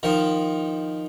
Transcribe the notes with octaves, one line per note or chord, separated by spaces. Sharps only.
D#3 F3